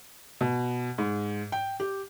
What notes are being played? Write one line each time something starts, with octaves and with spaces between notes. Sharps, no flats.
B2
G#2
G5
G4